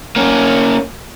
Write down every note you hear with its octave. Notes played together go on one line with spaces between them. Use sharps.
A#3 C#4